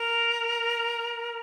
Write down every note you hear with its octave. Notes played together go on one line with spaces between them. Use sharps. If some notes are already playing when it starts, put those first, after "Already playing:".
Already playing: A#4